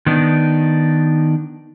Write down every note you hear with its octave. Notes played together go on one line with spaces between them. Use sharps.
D#3 B3 D4 D#4